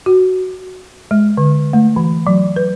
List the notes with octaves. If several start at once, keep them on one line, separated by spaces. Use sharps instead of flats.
F#4
G#3
D3
A3
E3
F#3
B4